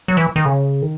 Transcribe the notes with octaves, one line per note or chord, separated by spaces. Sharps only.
F#3
E3
D#3
C#3
D#3